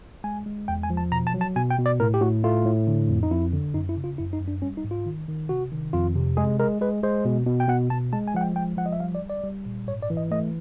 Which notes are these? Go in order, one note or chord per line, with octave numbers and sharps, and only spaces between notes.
G#3 G#5
G#3
E2 G5
G#5
F3
A5
B2 A#5
A5
F#3
A5
B2 G#5
G5
B2
D5
A2 A#4
G4
A2 F#4
A3 F4
A2
D3
F2
D#4
F2 E4
D3
F#2 D#4
E4
C#3
F4
F#2 E4
D#4
F#2
D4
G3 C#4
D#4
G#2
F4
D#3
D#3
C3 F#4
D#3
F2 F4
C3
G#3 G#4
G#3 A#4
G#3 B4
G#3 C5
B2
B2
G5
B2 F#5
B2 A5
G#3 A5
G#5
F3 F#5
G5
G#3 G5
F3 F#5
D#5
E5
G3 F5
D5
G3
D5
G3
A#2
G#2 C#5
D5
E3
D#5
A3 D#5